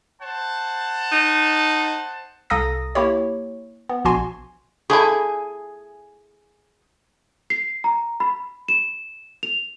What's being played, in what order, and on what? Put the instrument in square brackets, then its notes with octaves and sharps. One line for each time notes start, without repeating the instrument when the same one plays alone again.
[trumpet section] C5 F#5 A5
[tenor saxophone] D#4
[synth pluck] C2 A4 F5 A#5 D#6 A#6
A#3 E4 G4 C#5
B3
A#1 B2 F#4 G#5 C6
[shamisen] A3 E4 [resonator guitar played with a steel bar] G#4 G#5
[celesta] C7
A#5
B5
E7
F7